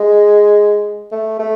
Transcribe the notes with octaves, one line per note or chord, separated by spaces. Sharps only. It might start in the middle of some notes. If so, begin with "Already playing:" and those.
Already playing: G#3
A3
A3